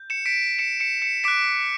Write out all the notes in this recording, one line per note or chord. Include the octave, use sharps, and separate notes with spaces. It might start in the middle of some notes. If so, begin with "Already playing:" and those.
Already playing: G6
C#7 E7
B6 D7
C#7 E7
C#7 E7
C#7 E7
D6 F#6 B6 D7